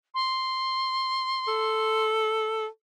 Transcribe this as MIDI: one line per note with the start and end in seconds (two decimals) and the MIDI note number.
0.14 2.05 84
1.48 2.67 69